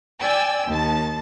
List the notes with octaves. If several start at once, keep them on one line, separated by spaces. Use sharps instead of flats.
D5 G5 G#5 E6
D#2 A5